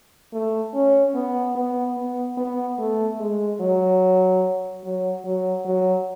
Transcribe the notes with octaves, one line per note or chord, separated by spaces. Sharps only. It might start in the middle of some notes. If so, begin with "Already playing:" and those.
A3
C#4
B3
B3
B3
B3
A3
G#3
F#3
F#3
F#3
F#3